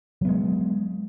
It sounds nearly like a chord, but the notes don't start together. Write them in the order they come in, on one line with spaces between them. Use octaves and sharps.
F#3 B3 G#3